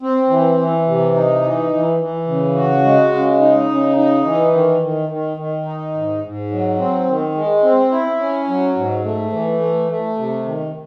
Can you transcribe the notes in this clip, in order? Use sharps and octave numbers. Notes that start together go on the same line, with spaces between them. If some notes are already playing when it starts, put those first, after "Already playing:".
C4
E3
E3
C3
D#4
E3
E3
E3
C#3
F#4
G#3
C#3
D#4
C#3
D#4
E3
D#3
D#3
D#3
D#3
D#4
G#2
G#2
F#3
C4
D#3
G#3
C4
E4
C#4
F#3
G#2
A3
E3
A3
A3
C3
D#3